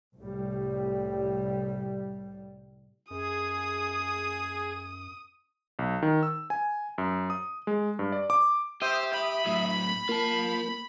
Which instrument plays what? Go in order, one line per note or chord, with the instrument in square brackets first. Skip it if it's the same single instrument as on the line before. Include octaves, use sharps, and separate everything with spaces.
[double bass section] C2 A2 G3
[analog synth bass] F#2 [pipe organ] G#4 [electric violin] D#6
[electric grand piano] B1
D#3
E6
G#5
F#2
D#6
G#3
G2
D5
D6
[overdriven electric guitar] G4 [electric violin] C5 [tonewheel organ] E5 D#6
[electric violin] B5
[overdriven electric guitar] A2 F#3
[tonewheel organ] A#3 [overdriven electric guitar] F4 A5